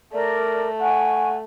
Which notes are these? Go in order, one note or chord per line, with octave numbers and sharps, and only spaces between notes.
A3 A#4 D5
F#5 G#5 C#6